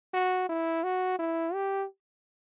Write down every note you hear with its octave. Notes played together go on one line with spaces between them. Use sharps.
F#4
E4
F#4
E4
G4